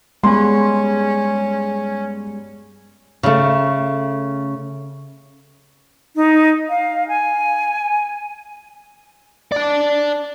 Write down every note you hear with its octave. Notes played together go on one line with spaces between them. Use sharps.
G2 G#3 B3 C#4 C6
C#3 A3
D#4
F5
G#5
D5 A5